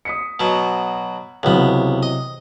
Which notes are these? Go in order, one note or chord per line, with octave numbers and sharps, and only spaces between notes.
D#6 B6 C#7
B2 F#3
C#2 C3 E3 F#3 B3
D#5